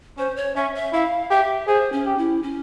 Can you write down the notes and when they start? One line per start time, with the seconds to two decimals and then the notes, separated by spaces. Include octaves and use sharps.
0.18 C#4 C5
0.36 C#5
0.56 C#4 E5
0.75 E5
0.92 E4 F5
1.30 G4 E5
1.67 G#4 C5
1.92 C#4
2.06 G4
2.18 E4
2.43 C#4